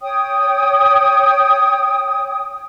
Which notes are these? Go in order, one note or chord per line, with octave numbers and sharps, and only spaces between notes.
C#5 G5 D#6